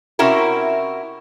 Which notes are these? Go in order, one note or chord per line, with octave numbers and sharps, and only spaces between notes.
C3 C#4 E4 F#4 A#4